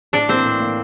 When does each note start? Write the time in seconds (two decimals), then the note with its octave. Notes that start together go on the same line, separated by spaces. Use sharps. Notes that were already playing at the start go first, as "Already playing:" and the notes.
0.13 A2 D4 D5
0.29 E3 A#3 C4 C5
0.45 A2
0.60 E3 A#3